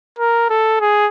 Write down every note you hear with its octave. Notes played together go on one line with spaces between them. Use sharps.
A#4
A4
G#4